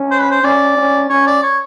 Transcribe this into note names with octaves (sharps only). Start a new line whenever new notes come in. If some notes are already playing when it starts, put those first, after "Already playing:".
Already playing: C#4
C5
B4
C5
C#4 D5
C#4
C#4 C#5
D5
C#5